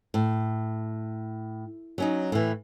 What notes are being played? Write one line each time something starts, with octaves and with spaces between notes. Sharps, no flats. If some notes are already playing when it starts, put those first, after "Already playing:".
A2
F#3 C#4 D#4
A2 E3